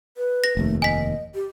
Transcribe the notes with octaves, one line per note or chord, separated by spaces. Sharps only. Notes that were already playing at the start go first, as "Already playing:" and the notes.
B4
A#6
F1 D#2 A3
D#5 G#5 B6
G4